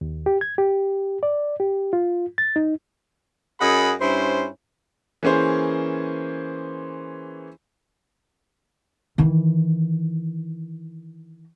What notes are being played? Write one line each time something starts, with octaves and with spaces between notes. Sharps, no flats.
D#2
G4
G#6
G4
D5
G4
F4
A6
D#4
F#2 G#4 D#5 F#5 B5
G2 C#4 E4 C5
E3 A#3 C#4 G#4 C5
D#3 E3